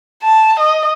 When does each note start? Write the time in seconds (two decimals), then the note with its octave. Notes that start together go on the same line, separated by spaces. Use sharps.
0.23 A5
0.60 D#5